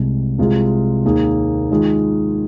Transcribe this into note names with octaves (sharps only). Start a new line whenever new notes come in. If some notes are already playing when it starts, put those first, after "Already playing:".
Already playing: C2 C3 G#3
C2 C3 G#3 F4 G#4
D#2 D#3 A#3 G#4
D#3 G#3 F4 G#4